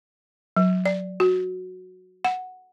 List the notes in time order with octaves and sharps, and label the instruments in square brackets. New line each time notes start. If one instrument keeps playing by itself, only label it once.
[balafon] F#3
D5
F#4
F#5